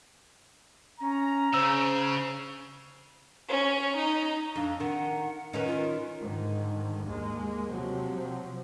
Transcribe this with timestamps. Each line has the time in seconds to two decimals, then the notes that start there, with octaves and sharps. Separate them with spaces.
1.01 C#4 A#5
1.54 C#3 C5 E6
3.48 C#4
3.96 D#4
4.56 F2 D4
4.80 D#3 F#5
5.53 D#3 C#4 D#4 B4
5.67 F4
6.21 G#2 D3 D#3
7.07 D#2 G#3 A#3
7.71 C3 F3 F#3 C4